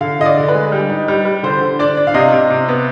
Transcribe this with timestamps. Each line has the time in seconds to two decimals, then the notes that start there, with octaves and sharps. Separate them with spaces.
0.01 D3 F5
0.20 D3 D#5
0.26 D5
0.37 D3
0.48 B4
0.54 G#3
0.72 G3
0.90 D#4
1.08 G3
1.25 G3
1.43 D3 C5
1.61 D3
1.79 D4 D5
1.97 D4
2.07 F5
2.14 C3 D#5
2.32 C3
2.50 C3
2.68 B3